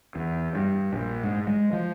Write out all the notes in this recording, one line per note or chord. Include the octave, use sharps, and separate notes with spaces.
E2
G2
A#1
G#2
G#3
F3